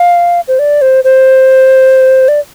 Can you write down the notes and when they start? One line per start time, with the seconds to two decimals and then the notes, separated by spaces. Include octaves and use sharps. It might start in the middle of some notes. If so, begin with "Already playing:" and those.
Already playing: F5
0.48 C5
0.59 D5
0.82 C5
1.04 C5
2.28 D5